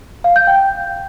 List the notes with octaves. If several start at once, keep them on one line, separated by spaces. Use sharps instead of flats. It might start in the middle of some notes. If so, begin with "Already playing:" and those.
F5
G6
G5